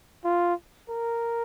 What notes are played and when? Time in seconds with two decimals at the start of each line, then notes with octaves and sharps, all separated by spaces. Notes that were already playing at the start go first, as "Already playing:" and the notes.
0.25 F4
0.90 A#4